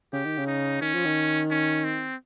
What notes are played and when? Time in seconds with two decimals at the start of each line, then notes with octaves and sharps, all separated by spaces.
0.13 C#3 G4
0.25 D#3
0.38 C#3
0.47 D#4
0.81 D#3 C#4
0.94 F3
1.05 D#3
1.50 C#4
1.84 C4